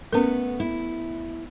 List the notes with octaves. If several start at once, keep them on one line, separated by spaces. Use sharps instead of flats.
A3 B3 C#4 A#4
E4